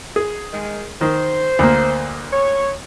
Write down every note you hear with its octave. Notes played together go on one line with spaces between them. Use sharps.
G#4
D#3 G#3
D#3 C5
D2 A#3
C#5